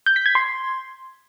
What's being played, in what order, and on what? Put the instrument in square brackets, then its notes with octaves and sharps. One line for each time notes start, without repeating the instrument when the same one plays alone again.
[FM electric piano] G6
B6
G#6
C6